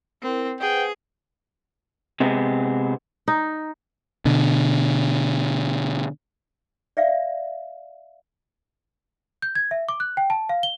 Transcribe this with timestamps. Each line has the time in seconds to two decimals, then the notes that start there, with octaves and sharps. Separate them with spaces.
0.23 C4 E4 A#4
0.61 G#4 B4 C5 F#5 G5
2.20 C3 G#3 B3 C4
3.28 D#4
4.25 B2 D3
6.97 D5 E5 F5
9.42 G6
9.55 G#6
9.71 E5
9.89 D6
10.00 F#6
10.17 G5
10.30 A5
10.49 F5
10.63 G7